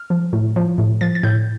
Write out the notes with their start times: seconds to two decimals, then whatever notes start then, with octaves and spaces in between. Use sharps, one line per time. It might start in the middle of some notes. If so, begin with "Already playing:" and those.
Already playing: F6
0.10 F3
0.33 A2
0.56 F3
0.78 A2
1.01 F3 A6
1.15 A6
1.23 A2 G6